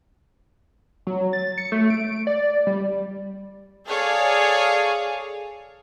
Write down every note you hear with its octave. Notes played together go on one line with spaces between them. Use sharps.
F#3
A6
C#7
A3
D7
D5
G3
G#4 A4 C#5 D5 F5